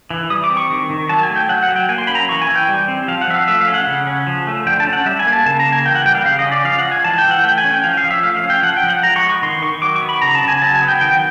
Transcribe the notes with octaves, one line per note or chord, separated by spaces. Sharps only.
E3
G3 D#6
D6
C4
C#6
D#3
D#3
F#3 A5
G#5
A3
G5
F#3 F#5
F#5
F#3
G5
A#3 G#5
C6
C#4 B5
A#5
E3 C#6
G#5
E3
G5
G3
C4
F3 F5
F#5
F3 E5
F5
A3 E5
F5
C#4
F#5
C#3
C#4
F3
A3
D3 G5
A5
C#4
F#5
G3 E5
G#5
A#3
A5
C#3 A5
A#5
A#3
G#5
E3 G5
F#5
G3 G5
F5
C#3 F5
D#5
C#4
D5
F3 F5
F#5
G#3
G#5
E3 A5
G5
E3
F#5
A3 G5
G#5
C#4
G5
F3 F5
F5
F3
E5
A3 F5
F5
C#4
G5
F3 F#5
G5
F3
F#5
G#3 A#5
C#6
B3
C#6
D#3 C6
D#3 C#6
F#3 D6
C#6
B3
B5
C#3 A#5
A5
C#3
G#5
F#3 A5
G#5
B3
G5
D#3 G5